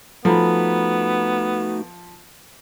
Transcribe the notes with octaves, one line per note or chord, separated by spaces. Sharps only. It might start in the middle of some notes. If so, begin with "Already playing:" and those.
F3 A3 B3 D#4 F#4 A4 A#5 B5